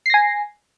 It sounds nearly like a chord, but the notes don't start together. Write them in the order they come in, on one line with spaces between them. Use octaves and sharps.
C7 A#6 G#5